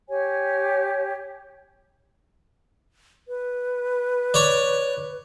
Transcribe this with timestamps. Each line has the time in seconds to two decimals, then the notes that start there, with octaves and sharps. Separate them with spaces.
0.08 G4 C#5 G#5
3.28 B4
4.34 C#5 D5